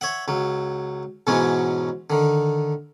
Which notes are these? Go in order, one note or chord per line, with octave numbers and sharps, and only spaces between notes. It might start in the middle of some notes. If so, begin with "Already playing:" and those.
C#5 E5 F#5
C#2 F#3
G#2 B2 E3 F#3 G#3 C#4
D3 D#3